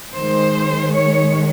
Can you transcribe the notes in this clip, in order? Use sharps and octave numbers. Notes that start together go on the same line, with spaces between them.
D#3 G#3 C5
C#5